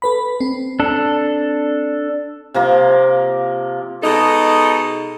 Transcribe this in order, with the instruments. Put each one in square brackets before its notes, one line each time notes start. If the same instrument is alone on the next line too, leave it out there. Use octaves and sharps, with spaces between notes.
[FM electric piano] A4 B4 B5
C4
[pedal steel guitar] D4 A4
[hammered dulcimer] C3 F3 A#3
[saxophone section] B2 G#3 D#4 A4